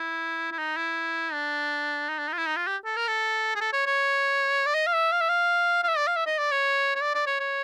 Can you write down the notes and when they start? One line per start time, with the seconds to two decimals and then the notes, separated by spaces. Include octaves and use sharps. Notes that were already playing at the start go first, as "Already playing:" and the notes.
Already playing: E4
0.52 E4
0.59 D#4
0.77 E4
1.33 D4
2.09 D#4
2.19 D4
2.28 D#4
2.33 F4
2.38 E4
2.47 D#4
2.57 F4
2.67 G4
2.85 A4
2.97 A#4
3.08 A4
3.56 G#4
3.61 A4
3.73 C#5
3.86 C#5
4.66 D5
4.75 D#5
4.87 F5
4.93 E5
5.12 F5
5.21 E5
5.29 F5
5.83 F5
5.88 E5
5.97 D5
6.07 F5
6.16 E5
6.26 D#5
6.39 D5
6.51 C#5
6.95 C#5
7.01 D5
7.15 D5
7.27 C#5
7.40 C#5